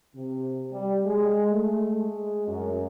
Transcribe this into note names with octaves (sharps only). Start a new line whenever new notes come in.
C3
G3
G#3
A3
G#3
F#2